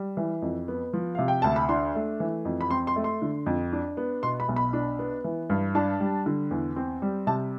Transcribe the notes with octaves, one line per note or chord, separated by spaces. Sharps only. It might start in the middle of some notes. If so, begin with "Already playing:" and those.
Already playing: G3
E3
F2
B3
F3
C3 F5
G5
D2 A5
B5
D4 C6
A3
E3
F2
B5
C4 C6
C6
A3
C6
D3
F2
D4
B3
B2 C6
B5
B1
B5
D4
B3
E3
G2
D4 A5
G3
D3
E2
C4
G3
C3 A5